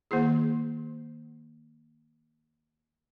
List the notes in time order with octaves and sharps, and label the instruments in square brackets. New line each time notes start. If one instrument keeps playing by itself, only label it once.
[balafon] D#3 A#3 E4 G#4